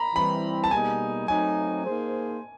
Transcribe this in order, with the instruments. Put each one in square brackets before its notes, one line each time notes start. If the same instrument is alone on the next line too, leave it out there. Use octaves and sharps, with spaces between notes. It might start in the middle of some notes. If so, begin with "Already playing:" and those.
Already playing: [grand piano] A#5 B5
[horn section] E3 G3 C4 [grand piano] B5
[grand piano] A5
[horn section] B2 G3 A#3 D#4 G#4 [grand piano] G#5
[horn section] F#3 A3 C4 D#4 [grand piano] G#5
[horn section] A#3 D#4 G#4 C5